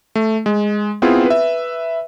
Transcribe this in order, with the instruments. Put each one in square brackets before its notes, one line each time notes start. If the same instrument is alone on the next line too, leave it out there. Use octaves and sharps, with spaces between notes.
[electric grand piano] A3
G#3
B3 C4 E4 F4 G#4
B4 E5